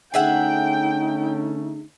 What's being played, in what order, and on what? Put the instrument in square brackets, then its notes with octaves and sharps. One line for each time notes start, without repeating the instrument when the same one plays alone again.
[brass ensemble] D3 A3 C#4 [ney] D#4 [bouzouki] G#4 E5 F#5 [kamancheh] G5